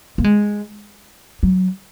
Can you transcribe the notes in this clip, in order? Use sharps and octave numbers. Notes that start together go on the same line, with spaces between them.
A#3
G#3
F#3